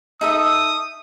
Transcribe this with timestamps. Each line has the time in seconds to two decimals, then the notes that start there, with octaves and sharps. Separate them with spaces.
0.21 D#4 A4 E5 D#6